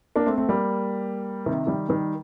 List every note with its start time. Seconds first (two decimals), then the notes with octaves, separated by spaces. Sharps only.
0.16 A#3 D4
0.26 A3 C4
0.38 A3 C4
0.49 G3 A#3
1.46 C3 D#3
1.67 D#3 G3
1.89 D#3 G3